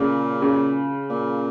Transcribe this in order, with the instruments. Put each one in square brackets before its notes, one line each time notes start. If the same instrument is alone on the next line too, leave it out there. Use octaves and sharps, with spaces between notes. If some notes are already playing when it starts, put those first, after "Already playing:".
Already playing: [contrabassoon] A#2 [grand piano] C#3
[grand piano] C#3
[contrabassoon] A#2